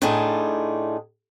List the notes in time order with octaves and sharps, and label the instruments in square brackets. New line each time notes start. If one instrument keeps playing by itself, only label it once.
[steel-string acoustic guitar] A2 D4 D#4 F4 G#4 A5